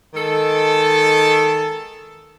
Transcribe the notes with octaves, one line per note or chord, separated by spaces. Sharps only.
D#3 G#3 A4